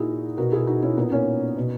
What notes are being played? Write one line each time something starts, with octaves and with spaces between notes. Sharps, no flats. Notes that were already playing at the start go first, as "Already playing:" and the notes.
Already playing: A#2 D#4 E4 F#4 G#4
B2 F#4 A#4
E4 G#4
D#4 F#4
C#4 E4
A#2 B3 D#4
A#3 C#4
B2